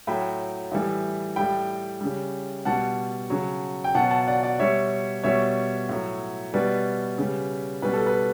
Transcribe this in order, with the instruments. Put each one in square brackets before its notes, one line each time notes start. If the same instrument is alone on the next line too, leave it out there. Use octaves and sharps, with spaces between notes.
[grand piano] A2 F#3 G5 B5
A2 E3 G3
A2 G3 G5 B5
C#3 G3
B2 G3 F#5 A5
C#3 F#3
G5
B2 F#3 F#5 A5
F#5 A5
D5 F#5
D5 F#5
B2 G3 C#5 E5
B2 G3 C#5 E5
A2 F#3
B2 G3 B4 D5
C#3 G3
B2 G3 B4
A4
B4